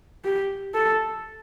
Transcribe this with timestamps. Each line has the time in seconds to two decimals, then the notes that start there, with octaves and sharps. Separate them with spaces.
0.25 G4
0.74 A4